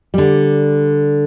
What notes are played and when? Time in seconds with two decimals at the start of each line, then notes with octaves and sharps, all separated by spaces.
0.14 D3 G3